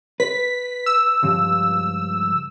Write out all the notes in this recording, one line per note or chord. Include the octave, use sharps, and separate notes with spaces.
B4 B6
E6
C#2 G2 F3